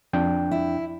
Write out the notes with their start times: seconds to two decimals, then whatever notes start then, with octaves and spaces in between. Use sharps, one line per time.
0.13 F2 D4 G5
0.51 E4